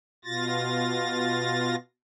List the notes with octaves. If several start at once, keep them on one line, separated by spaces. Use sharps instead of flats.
B2 F4 A6 A#6